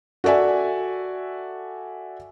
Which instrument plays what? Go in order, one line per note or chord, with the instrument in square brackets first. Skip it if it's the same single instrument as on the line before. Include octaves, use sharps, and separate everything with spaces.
[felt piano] F#4 A4 D5 E5 G#5